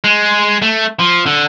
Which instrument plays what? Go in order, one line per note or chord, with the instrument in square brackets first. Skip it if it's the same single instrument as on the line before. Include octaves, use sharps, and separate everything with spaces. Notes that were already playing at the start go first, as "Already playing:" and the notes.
[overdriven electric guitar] G#3
A3
F3
D3